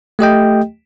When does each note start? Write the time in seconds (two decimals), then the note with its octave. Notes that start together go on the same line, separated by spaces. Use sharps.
0.19 A3 G4 D#5 G5